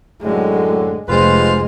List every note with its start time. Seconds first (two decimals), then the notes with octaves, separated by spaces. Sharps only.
0.23 F#2 A2 D3 G#3
1.08 F1 G#3 F4 B4 C5